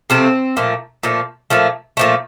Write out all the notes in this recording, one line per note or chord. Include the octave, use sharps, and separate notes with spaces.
C3 F3 A3 C4
A#2 F3 A3
A#2 F3 A3
A#2 F3 A3
A#2 F3 A3